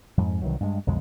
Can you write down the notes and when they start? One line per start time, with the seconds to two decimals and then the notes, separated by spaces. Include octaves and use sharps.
0.17 F2 G#2
0.42 C2 D#3 E3 F#3
0.60 G2 G#3
0.87 B1 F2 D3 G#3